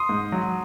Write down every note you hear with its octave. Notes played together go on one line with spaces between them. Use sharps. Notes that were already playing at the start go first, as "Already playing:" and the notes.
Already playing: C6 D#6
G#2
F#3